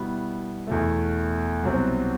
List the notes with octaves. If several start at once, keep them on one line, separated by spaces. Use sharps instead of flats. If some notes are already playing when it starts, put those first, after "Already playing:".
Already playing: B2 G3 B3 E4
E2 B2 A3
C2 B2 F#3 C4